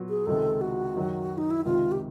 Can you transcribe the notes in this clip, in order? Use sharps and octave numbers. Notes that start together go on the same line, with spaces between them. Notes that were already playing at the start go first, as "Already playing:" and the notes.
Already playing: A#2 F#3 B3
G#4
C#2 C3 D#3 G#3 A4
F#4
F#2 D#3 F#3
D#4
E4
C#2 C3 D#3 F4
G4